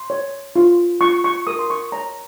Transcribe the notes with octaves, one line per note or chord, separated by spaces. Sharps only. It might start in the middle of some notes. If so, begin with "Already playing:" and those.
Already playing: C6
C#5
F4
F4 C#6
C#6
A#4 D#6
C6
C#6
C#5 A#5